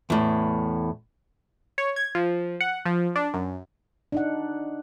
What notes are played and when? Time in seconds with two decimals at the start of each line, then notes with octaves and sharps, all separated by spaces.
0.10 E2 A2
1.78 C#5
1.96 G#6
2.15 F3
2.61 F#5
2.86 F3
3.16 D4
3.34 F#2
4.12 D4 D#4 F#5